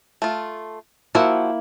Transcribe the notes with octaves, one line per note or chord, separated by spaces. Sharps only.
A3 F4
F3 A#3 E4 F#4 F#5